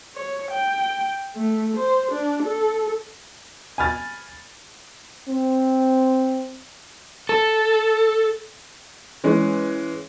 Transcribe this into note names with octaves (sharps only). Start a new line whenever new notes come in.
C#5
G5
A3
C5
D4
A4
G#5 B5 F6 A6
C4
A4
E3 G#3 C#4